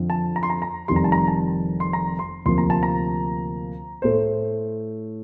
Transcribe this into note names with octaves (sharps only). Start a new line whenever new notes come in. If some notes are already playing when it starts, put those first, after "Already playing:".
Already playing: F2 D3 F3 C4
A5
A#5
C6
A#5
A#5
F1 F2 D#3 G3 C6
A#5
A5
A#5
A5
C6
A#5
C6
D2 C3 F3 A#3 C6
A#5
A5
A#5
A2 A3 C5